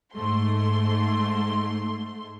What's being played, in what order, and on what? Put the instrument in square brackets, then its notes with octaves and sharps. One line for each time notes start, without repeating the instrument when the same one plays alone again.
[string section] G#2 A3 C6